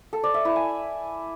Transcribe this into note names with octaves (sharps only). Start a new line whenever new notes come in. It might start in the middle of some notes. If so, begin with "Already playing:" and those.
A4
D5
E5
E4
G#5